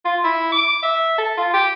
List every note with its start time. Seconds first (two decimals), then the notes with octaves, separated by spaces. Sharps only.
0.05 F4
0.24 E4
0.52 D6
0.83 E5
1.18 A4
1.37 F4
1.54 G4